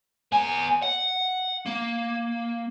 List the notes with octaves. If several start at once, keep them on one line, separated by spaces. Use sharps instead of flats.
B3 G#5
F#5
A#3